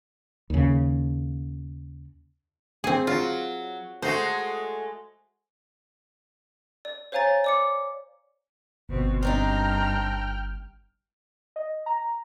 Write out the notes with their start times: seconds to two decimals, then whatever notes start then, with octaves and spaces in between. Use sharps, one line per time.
0.50 D#2 C#3
2.84 C4 G#4
3.07 F#3 F4
4.02 G#3 A3 F#4 C5
6.85 D5
7.12 C5 C#5 F5 G#5 A#5 A6
7.44 D5 D6 C#7
8.89 G1 B2 C4
9.23 G2 C4 D4 D#4 G5 A#5 F6
11.56 D#5
11.86 A#5